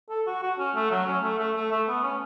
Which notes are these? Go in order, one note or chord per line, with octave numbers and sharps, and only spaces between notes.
A4
F#4
F#4
C#4
A3
F#3
C#4
A3
A3
A3
A3
B3
C#4